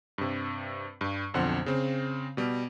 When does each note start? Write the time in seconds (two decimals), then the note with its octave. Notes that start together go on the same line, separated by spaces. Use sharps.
0.18 G2 C3
1.01 G2
1.34 B1 F2 D3 C5 F#5
1.66 C#3 C4
2.37 B2 G3